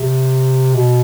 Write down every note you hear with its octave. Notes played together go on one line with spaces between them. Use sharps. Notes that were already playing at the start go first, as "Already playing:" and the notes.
Already playing: C3
B2